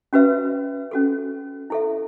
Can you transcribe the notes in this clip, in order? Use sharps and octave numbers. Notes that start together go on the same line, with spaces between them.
C#4 F#4 B4 E5
C#4 F#4 A4
E4 A4 E5